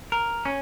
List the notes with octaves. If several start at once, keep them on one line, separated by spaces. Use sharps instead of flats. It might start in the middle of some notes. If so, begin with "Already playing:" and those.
A#4
C#4